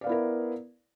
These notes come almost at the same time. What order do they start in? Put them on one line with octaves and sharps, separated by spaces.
D5 F5 B3 E4 A#4